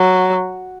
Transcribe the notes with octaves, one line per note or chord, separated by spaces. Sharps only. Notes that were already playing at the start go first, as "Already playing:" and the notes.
Already playing: F#3